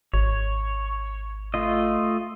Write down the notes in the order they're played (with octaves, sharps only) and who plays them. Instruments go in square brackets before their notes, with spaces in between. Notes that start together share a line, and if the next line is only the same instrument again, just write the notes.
[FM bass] G#1 [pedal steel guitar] C#5
[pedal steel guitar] A3 F4 D#5